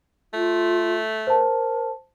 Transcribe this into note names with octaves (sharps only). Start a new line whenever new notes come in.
A3 F4
A#4 C5 A5